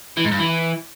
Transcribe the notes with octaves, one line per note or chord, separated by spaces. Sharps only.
E3
G#2
G2
E3